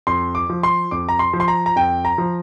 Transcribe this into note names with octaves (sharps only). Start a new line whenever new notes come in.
F2 C6
D6
F3
C6
F2 D6
A#5
C6
F3
C6
A#5
A#5
F2 G5
A#5
F3